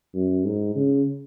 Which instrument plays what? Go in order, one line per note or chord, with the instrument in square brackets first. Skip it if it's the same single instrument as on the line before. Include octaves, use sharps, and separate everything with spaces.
[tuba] F#2
G#2
C#3